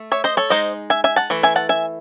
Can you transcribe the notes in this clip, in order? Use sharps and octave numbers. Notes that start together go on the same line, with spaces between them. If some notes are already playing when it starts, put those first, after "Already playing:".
Already playing: A3
C#5 E5
C5 D#5
A4 C#5
G#3 D#4 C5 D#5
E5 G#5
E5 G#5
F#5 A5
E3 A3
E5 G#5
F#5 A5
E5 G#5